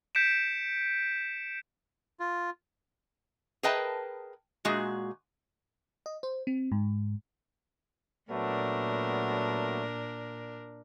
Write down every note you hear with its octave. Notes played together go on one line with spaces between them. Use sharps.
G6 B6 C#7 D7 E7
F4
G#4 A#4 B4 D#5 G5 A5
A#2 G#3 F#4 G#4
D#5
C5
C4
G#2
A#2 F#3 A3 B3 D4 A#4